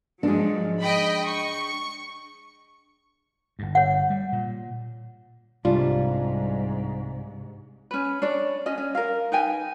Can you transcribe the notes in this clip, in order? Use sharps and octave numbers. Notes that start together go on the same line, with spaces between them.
G#2 F3 F#3 G#3 D4
D#5 G5 B5
C#6
G1 G2
C#5 F#5
G3
A#2
C2 G#2 G3 D4 F4
C#4 B4
D4 C#5 D5
C#4 D#5
C#4
A#4 F5
D#4 B4 G5 G#5